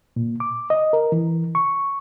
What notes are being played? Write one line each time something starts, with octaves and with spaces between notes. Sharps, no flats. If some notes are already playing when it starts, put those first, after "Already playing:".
A#2
D6
D#5
A#4
E3
C#6